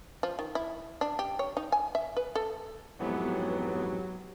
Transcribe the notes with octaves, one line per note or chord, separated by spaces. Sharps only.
F3
D#3
E4
D4
G4
C#5
D#4
G#5
E5
B4
A4
F2 G#2 E3 F#3 B3 G4